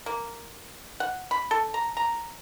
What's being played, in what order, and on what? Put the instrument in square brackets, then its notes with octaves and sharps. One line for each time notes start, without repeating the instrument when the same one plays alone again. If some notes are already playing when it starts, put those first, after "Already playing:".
[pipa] A#3
F#5
B5
A4
A#5
A#5